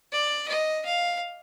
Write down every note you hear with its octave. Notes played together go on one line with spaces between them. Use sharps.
D5
D#5
F5